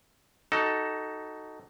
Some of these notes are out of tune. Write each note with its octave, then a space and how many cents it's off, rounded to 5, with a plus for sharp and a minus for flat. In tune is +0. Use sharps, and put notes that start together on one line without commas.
D#4 +0 F#4 +30 A4 +0